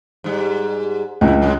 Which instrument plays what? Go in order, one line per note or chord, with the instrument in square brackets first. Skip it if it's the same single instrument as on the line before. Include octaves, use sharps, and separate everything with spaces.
[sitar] G#2 G3
[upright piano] C#2 [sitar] F#2 E4
[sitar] B2 F#3 G#3